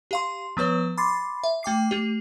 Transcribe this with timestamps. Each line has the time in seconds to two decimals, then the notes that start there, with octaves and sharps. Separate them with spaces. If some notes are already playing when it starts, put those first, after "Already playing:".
0.11 G4 F5 C6
0.57 F3 B3 B4 C#5
0.98 B5 C6 D6 A6 C7
1.44 E5
1.63 A3 G5 D6 C7
1.91 A3 G4